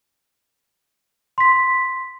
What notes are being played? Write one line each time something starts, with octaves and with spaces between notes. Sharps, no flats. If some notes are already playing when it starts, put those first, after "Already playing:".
C6 B6